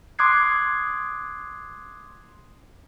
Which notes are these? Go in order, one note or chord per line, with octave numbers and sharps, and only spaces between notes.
C6 D6 D#6 F#6 G#6 C7